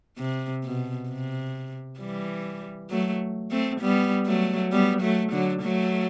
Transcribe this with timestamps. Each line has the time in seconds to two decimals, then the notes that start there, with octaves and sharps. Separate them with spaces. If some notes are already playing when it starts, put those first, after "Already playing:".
0.18 C3
0.64 B2
1.09 C3
2.00 E3 G3
2.90 F#3 A3
3.51 A3 C4
3.81 G3 B3
4.26 F#3 A3
4.72 G3 B3
5.02 F#3 A3
5.32 D3 F#3
5.62 F#3 A3